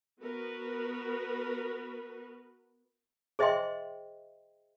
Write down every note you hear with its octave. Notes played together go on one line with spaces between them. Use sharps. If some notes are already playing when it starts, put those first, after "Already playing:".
B3 F#4 A#4 B4
G#4 C5 D#5 E5 G5 C6